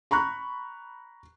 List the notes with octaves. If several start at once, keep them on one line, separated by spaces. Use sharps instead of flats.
A#5 B5 C#6 F#6